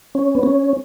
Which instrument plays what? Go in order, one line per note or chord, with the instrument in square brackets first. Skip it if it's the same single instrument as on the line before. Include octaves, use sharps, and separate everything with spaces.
[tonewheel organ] C#4
B3
C#4